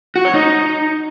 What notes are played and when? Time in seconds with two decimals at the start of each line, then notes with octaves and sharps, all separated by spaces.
0.16 F#4
0.25 C#5
0.34 D#4